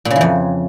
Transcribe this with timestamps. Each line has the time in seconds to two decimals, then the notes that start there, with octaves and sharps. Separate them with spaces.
0.05 A#2
0.11 C#3
0.16 E3
0.21 F2